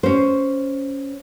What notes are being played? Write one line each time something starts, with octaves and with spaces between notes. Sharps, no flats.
C#4 C5